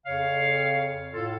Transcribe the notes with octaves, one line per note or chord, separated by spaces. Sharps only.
F2 C#3 C#5 F5
A2 F4 A4